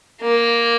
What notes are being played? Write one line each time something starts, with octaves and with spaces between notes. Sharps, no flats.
A#3